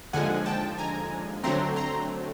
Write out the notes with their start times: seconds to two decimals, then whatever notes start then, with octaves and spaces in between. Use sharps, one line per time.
0.13 D#2 D3 F3 G#3 F#5 G#5
0.46 G5 A5
0.78 G#5 A#5
1.44 D3 F#3 A3 C4 A#5 C6
1.76 A#5 C6